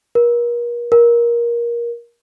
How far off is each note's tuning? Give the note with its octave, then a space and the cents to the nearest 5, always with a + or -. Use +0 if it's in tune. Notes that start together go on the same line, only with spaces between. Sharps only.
A#4 +40
A#4 +20